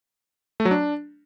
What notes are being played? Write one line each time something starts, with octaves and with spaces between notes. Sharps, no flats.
A3
F#3
D4